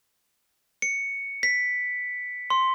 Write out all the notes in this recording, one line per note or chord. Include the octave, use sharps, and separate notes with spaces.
C#7
B6
C6